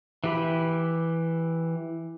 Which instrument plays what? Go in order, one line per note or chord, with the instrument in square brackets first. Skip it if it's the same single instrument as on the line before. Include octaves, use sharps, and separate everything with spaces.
[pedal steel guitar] E3 G4 B5